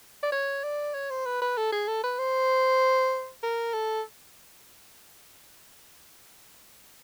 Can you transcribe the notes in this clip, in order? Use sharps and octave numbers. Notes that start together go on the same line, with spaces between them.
D5
C#5
D5
C#5
C5
B4
B4
A4
G#4
A4
B4
C5
A#4
A4